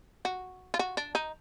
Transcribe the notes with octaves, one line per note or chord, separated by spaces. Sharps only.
F#4
F4
F#4
D4
D#4